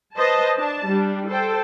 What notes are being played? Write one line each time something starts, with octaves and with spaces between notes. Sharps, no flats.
B4 C5 D#5 A5
D4 A5
G3 D4
A4 C5 G5